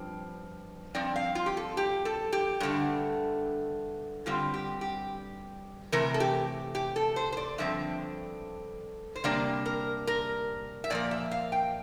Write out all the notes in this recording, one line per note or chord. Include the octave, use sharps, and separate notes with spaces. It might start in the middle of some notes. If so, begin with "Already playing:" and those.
Already playing: G2 F3 C4
G2 F3 C4 D5
F5
F4
G4
A4
G4
A4
G4
G2 D3 A3
G2 D3 G3 C4 F4
G4
G4
C3 E3 A3 A#4
A4
G4
G4
A4
C5
C5
D5
G2 D3 F3 C4 E5
C5
C3 G3 A#3 D4 D5
A#4
A#4
E5
A#2 F3 A#3 D5
E5
F5
G5